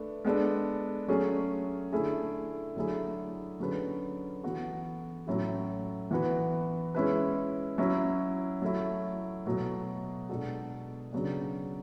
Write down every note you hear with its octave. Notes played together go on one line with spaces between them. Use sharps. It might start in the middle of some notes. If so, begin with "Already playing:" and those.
Already playing: A3 D4 B4
G#3 B3 D4 A4
F#3 A3 C#4 G#4
D3 A3 E4 G#4
D3 F#3 A3 E4 G#4
D3 F#3 C#4 G#4 B4
E3 B3 F#4 A4
A2 F#3 C#4 E4 A4
E3 B3 F#4 B4
G#3 C#4 E4 B4
F#3 C#4 E4
F#3 A3 E4
B2 F#3 A3
B2 G#3 D4 F#4 A4
C#3 F#3 B3 D4